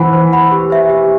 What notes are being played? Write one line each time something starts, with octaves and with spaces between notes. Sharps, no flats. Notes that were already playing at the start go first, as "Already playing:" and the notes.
Already playing: E3 C5 F#5 B5
C5
F#5 B5
G4
C5 E5
G4